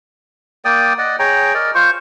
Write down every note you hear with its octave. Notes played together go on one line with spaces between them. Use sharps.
A#3 D5 G5 D#6
D5 D#5 F#5
G#4 C#5 G5 A#5
A#4 D5 D#5
F4 C5 C#6